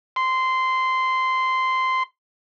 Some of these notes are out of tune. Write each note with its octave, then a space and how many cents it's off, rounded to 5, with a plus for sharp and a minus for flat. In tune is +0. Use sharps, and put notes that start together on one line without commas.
C6 -15